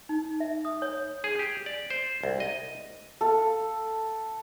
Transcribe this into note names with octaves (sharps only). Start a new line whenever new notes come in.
D#4
E5
D#6
C#5
G#4
G4
D5
C5
C2
D#5
A4 F5